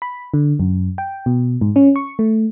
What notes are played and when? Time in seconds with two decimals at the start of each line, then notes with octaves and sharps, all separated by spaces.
0.02 B5
0.34 D3
0.60 F#2
0.98 G5
1.26 B2
1.61 G#2
1.76 C#4
1.96 C#6
2.19 A3